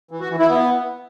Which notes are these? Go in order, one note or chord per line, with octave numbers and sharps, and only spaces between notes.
E3
F#4
E3
E4
B3